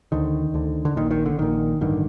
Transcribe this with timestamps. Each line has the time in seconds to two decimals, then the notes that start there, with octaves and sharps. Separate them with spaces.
0.12 D2 D3 D#3
0.54 D2 D3
0.85 D3
0.96 A#1 A#2 D#3
1.11 D#3
1.26 D3
1.38 A#1 A#2 D#3
1.81 A1 G2 D3 D#3